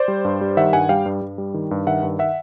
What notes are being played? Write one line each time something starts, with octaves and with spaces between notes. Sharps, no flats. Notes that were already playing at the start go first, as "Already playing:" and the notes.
Already playing: C5 D5
G3
G2
G3
D#3 E5 F#5
G2 F#5 G#5
G3 F5 G5
G2
G2
G3
D#3
G2
D#3 E5 F#5
G2
E5 F#5